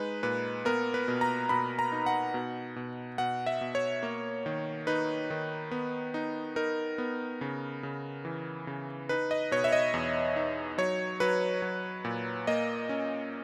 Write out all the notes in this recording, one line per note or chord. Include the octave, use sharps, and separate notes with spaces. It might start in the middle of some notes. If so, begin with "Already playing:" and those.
Already playing: G#3 D#4 B4
A#2 B4
B3 A#4
B4
B2
A#5
B2 B5
A#5
D#4
F#5
B2
B2
B2 F#5
E5
B2
C#5
A#3
D#3
D#4 B4
D#3
B3
D#4
D#4 A#4
B3
C#3
C#3
E3
C#3
D#4 B4
D#5
B2 C#5
E5
D#5
E2
D#4
F#3 C#5
F#3 B4
F#3
A#2
A#3 D#5
C#4